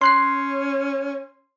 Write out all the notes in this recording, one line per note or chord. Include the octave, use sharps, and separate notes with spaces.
C#4 C6 F#6 C7